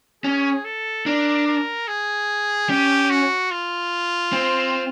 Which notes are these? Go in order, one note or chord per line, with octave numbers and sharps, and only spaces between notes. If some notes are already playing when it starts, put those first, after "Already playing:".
C#4 G#4
A4
D4 A#4
A#4
G#4
C#4 G4
F#4
F4
C4